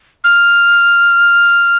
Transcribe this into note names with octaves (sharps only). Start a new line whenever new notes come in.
F6